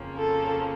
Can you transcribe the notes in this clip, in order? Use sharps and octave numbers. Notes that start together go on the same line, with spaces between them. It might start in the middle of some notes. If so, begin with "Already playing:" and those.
Already playing: F2 C#3 F3 A#3 C#4
A4